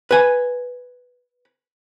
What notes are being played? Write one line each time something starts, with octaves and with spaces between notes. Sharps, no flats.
B4 G#5